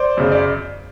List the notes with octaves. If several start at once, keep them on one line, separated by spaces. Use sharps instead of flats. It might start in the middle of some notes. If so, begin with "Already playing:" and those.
Already playing: C5 D5
F#2 C#3
D5